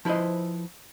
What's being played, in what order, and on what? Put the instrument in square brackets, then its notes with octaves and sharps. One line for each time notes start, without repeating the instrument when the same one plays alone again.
[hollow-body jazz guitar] F3 E4 B4 C5 D#5